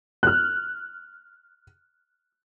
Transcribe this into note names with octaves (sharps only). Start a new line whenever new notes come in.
F6 F#6